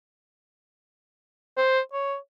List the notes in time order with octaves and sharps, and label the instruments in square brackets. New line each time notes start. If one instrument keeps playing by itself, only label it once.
[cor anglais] C5
C#5